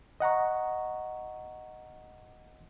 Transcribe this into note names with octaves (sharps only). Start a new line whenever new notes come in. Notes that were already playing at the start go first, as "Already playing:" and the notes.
D#5 F#5 A#5 C#6